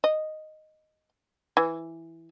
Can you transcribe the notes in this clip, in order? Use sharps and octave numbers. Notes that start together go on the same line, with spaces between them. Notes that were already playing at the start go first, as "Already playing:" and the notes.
D#5
E3